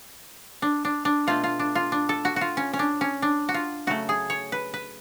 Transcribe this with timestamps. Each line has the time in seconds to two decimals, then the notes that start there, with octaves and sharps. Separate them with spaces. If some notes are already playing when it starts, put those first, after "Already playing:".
0.62 D4
0.85 D4
1.05 D4
1.27 B2 A3 F4
1.44 F4
1.59 D4
1.75 F4
1.92 D4
2.09 A4
2.25 F#4
2.36 F4 F#4
2.57 C#4
2.73 C#4
2.79 D4
3.01 C#4
3.22 D4
3.49 F#4
3.54 F4
3.87 C#3 F#3 A3 F#4
4.09 G#4
4.30 C#5
4.52 B4
4.74 B4